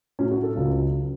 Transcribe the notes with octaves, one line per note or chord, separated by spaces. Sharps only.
A2 F#3 C#4
F#4
A4
C#2 C#3 F#3
C#3 F#3